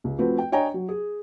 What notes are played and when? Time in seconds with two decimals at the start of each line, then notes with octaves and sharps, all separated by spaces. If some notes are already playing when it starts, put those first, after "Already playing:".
0.04 C#2
0.18 F3 A3 C4 F#4 B4
0.38 G5
0.52 D4 C#5 D#5 G5 G#5 A#5
0.74 F#3
0.89 G#4